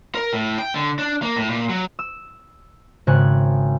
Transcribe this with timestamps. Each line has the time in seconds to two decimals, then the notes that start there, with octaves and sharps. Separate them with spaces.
0.15 A#4
0.33 A2
0.59 G5
0.75 D3
0.99 D4
1.22 A#3
1.36 A2
1.49 A#2
1.69 F#3
1.99 E6
3.07 G#1 C#3 G#5 F#6